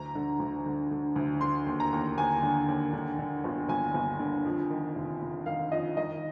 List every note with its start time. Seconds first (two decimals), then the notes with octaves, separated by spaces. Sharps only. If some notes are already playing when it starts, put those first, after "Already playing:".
Already playing: D2 A#5
0.15 D3
0.40 D2
0.66 D3
0.91 D3
1.16 D2
1.41 D3 C6
1.66 D#2
1.80 A#5
1.93 D#2
2.17 D#2 G#5
2.43 D3
2.68 D#2
2.93 D3
3.19 D3
3.44 G1
3.69 G1 G#5
3.94 G1
4.19 D3
4.45 F2
4.70 D#3
4.95 F1
5.22 F1
5.46 D#3 F5
5.72 F2 D#5
5.97 D#3 D#5